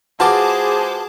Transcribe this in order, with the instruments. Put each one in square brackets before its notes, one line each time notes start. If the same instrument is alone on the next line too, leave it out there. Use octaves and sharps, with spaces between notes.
[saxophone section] G#3 C5 [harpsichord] F4 F#4 B4 [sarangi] G#4 [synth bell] A5 D6